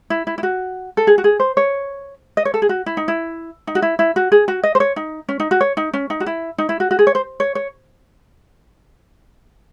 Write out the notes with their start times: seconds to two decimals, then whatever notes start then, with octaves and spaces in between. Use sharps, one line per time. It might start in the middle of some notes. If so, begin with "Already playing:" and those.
0.10 E4
0.27 E4
0.38 E4
0.43 F#4
0.97 A4
1.07 G#4
1.18 F#4
1.24 G#4
1.40 C5
1.57 C#5
2.37 D#5
2.45 C#5
2.54 A4
2.62 G#4
2.69 F#4
2.86 E4
2.97 D#4
3.08 E4
3.67 D#4
3.75 F#4
3.82 E4
3.99 E4
4.16 F#4
4.32 G#4
4.48 F#4
4.64 D#5
4.75 C5
4.80 C#5
4.96 D#4
5.29 C#4
5.40 D#4
5.51 F#4
5.61 C#5
5.77 D#4
5.93 C#4
6.10 D#4
6.20 F#4
6.26 E4
6.58 D#4
6.69 E4
6.80 F#4
6.91 F#4
6.99 G#4
7.07 C#5
7.15 C5
7.40 C#5
7.55 C#5